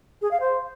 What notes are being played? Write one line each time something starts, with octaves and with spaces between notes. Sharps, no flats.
G#4
F5
C5